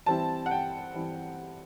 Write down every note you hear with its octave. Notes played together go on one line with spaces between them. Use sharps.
E3 G3 C4 E4 A5
F#5
G5
E3 G3 C4 E4